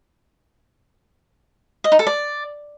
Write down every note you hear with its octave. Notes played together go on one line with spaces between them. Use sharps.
D#5
D#4
A4
D5